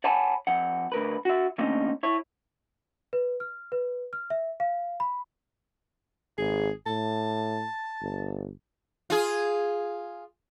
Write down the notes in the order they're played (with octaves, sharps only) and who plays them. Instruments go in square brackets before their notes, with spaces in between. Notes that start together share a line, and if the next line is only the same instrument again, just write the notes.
[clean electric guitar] C#5 F#5 G#5 A5 B5
F2 F#5
D2 A#4 B4
F#4 E5
D3 A3 A#3 C4 C#4 D#4
E4 C#5
[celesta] B4
F6
B4
F6
E5
F5
B5
[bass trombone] G#1 [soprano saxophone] G#4
[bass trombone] A2 [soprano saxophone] A5
[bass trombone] G1
[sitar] F4 G#4